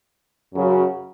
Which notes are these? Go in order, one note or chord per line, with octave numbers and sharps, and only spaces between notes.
F#2 C#3 F#3